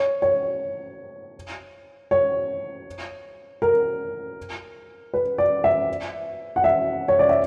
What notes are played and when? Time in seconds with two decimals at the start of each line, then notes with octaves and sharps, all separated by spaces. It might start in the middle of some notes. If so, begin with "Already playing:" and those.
Already playing: C#5
0.22 C#5
2.11 C#5
3.62 A#4
5.14 B4
5.38 D5
5.64 E5
6.56 F#5
6.64 E5
7.08 C#5
7.19 D5
7.29 E5